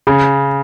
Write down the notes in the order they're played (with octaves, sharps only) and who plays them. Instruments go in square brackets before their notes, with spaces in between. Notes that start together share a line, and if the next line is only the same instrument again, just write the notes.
[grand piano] C#3